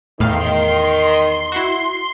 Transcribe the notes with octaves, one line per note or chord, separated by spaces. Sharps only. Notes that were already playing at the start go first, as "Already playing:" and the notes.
E2 A2 D#3 F5 C6
E4 F#4